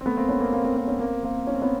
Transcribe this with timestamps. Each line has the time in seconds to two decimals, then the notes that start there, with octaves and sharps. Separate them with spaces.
0.01 C4
0.06 A3 B3
0.17 A#3 C4
0.29 B3 C#4
0.40 A#3 C4
0.53 A#3 C4
0.64 A#3 C4
0.76 A#3 C4
0.88 B3 C#4
1.00 A#3 C4
1.23 A#3 C4
1.47 C#4
1.54 C4
1.62 B3 C#4